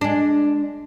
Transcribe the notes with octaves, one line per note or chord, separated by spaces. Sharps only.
G#3 D4